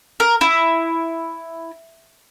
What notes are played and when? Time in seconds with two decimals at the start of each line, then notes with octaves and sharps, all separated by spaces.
0.20 A#4
0.41 E4